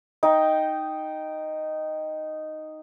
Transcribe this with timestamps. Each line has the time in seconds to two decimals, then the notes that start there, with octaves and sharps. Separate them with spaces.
0.23 D#4 G5